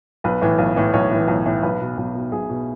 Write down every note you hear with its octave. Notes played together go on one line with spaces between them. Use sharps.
B1 B4
A2 E3
B1
A2 E3
B1 C#5
A2 E3
B1
A2 E3
B1 B4
B2
B1
B2
B1 G#4
B2